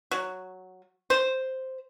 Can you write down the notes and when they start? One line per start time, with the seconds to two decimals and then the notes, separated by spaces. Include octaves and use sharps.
0.11 F#3
1.10 C5